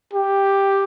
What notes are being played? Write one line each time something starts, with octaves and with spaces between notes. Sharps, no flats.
G4